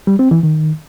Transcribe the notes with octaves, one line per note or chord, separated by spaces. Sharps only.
G3
C4
E3
D#3